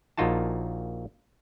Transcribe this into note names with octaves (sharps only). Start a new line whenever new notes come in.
A#1 A#3 D#4 F4 F#4 A5